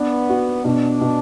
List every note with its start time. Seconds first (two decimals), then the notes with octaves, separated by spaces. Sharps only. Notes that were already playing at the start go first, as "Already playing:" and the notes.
Already playing: B3 D4
0.29 F#4
0.65 B2 D4
1.01 B2